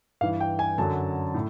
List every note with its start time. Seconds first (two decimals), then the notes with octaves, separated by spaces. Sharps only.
0.21 G2 E3 F5
0.41 G5
0.59 G#5
0.78 F#2 D3 F#3 A5
1.34 A2